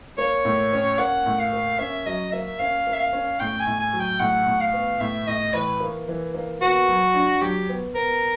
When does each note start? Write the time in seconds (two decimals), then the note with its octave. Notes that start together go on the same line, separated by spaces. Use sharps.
0.18 A#3 C#5
0.45 A2
0.73 C#4
0.99 A#3 F#5
1.26 A2
1.39 F5
1.53 A#3
1.78 C#4 E5
2.06 F#3 D#5
2.32 A#3 E5
2.60 C#4 F5
2.87 A#3
2.94 E5
2.99 F5
3.13 C#4
3.40 A2 G5
3.60 G#5
3.67 A2
3.80 G#5
3.93 F#3
4.00 G5
4.20 A2 F#5
4.47 A2
4.61 F5
4.73 B3
5.01 A2 E5
5.27 A2 D#5
5.54 E3 B4
5.80 A#3
6.08 E3
6.34 A#3
6.61 B3 F#4
6.88 F#3
7.14 D4
7.41 F#3 G4
7.69 B3
7.95 B3 A#4